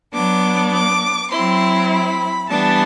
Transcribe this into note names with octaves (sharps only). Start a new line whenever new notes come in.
F#3 B3 D4 D6
D6
F#3 C4 E4 C6
B5
E3 G3 B3 D4 A5